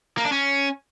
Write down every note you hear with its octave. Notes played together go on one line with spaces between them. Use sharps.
A#3
D4
C#4